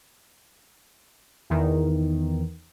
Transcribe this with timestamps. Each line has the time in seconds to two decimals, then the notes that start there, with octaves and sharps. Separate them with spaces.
1.50 E2 D#3